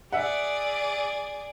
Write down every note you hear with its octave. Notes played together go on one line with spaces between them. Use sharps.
G#4 D5 E5 F#5